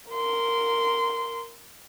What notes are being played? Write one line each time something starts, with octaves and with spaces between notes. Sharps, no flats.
A#4 C6